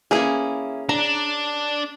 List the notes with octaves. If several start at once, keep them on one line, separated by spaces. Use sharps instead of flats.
E3 A#3 C#4 E4 G#4
D4 A#5